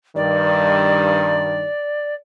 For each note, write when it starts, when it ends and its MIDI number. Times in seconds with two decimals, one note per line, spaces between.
0.16 1.68 43
0.16 1.68 51
0.16 2.15 74